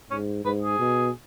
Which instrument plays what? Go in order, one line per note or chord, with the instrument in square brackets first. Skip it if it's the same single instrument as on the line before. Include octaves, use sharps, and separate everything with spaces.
[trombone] G#2 [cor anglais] C#4
[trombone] G#2 [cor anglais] B4
[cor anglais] G#4
[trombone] B2